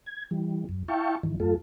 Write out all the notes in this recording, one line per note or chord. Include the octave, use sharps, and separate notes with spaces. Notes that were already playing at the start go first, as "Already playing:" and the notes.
G#6
E3 G3
F#2
E4 E5 F5 G5 A5 C#6
G#2 D#3 E3
F#2 A3 F4 A4